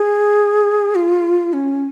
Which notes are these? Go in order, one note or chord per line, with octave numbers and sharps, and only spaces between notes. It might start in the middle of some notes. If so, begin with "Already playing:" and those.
Already playing: G#4
F4
C#4